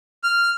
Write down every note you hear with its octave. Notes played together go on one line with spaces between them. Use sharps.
F6